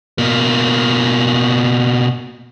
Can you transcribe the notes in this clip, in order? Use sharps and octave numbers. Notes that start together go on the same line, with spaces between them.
B2 A#3